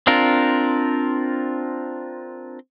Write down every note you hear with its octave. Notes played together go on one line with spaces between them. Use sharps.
C4 D4 F4 A#4